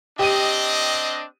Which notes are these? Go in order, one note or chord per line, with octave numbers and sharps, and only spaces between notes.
C4 D4 G4 D#5 D#7